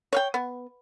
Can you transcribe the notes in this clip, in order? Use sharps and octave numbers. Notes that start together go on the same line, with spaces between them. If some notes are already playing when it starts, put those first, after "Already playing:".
C#5 F5 G5
B3